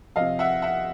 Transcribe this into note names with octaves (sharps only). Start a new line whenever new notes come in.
C3 F3 D#5 F5
E5 F#5
E5 F#5